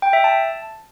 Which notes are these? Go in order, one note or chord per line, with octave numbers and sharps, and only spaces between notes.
G5
E5
A5